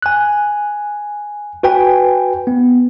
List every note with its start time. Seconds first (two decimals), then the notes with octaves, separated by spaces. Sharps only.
0.02 G#5 F#6
1.63 F#4 B4 G5 G#5
2.47 B3